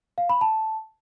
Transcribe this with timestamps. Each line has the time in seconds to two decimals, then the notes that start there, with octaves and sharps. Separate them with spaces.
0.18 F5
0.29 B5
0.41 A5